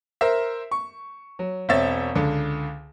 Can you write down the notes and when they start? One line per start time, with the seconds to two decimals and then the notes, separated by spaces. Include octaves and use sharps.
0.21 A#4 C5 E5
0.71 C#6
1.39 F#3
1.69 E1 C4 C#5 E5 A6
2.15 C#2 D3